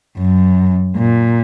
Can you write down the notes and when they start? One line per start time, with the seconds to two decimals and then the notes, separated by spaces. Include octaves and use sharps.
0.17 F#2
0.96 A#2